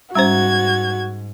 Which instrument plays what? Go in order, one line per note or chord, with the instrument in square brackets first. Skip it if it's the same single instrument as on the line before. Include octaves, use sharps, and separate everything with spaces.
[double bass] G#2 [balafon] G3 C#4 C5 [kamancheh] F#4 [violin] G#6